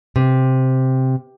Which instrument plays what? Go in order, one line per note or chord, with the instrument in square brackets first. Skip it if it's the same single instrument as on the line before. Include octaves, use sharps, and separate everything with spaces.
[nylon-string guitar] C3